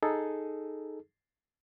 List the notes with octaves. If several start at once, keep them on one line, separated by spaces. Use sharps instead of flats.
D#4 G#4 A4